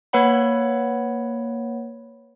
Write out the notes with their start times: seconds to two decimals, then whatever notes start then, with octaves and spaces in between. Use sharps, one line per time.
0.13 A#3 B4 C#5 F#5 B5